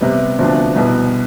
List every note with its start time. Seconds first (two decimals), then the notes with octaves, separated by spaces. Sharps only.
0.01 C3 G3 B3
0.38 D2 C3 F3 B3 D4
0.76 C2 B2 B3